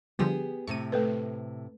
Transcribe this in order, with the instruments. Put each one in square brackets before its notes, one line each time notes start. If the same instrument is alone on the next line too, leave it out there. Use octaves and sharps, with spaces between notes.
[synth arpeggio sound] D3 F3 G3 [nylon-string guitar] B3 G4 G#4
[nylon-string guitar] A2 C3 [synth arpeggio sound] C#6 D#7
[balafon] A3 A4 B4